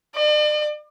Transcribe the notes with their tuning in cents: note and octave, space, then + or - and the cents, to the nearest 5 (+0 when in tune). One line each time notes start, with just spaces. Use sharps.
D5 +40